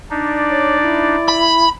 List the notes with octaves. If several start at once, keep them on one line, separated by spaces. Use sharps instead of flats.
D4 D#4 D5
C#5
E4
B5